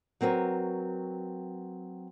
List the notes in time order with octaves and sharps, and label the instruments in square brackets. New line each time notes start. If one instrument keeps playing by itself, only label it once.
[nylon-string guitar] F#3 C4 A#4 B4 C#5